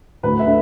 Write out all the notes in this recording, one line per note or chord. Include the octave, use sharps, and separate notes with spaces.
D2 B4
E5
D3